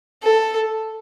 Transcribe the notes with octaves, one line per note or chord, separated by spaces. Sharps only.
A4